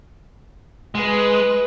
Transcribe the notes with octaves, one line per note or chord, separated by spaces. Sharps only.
G#3 B4